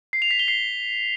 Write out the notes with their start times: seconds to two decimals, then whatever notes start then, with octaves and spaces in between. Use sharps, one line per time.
0.13 C7
0.22 F7
0.31 B6
0.39 G7
0.48 C7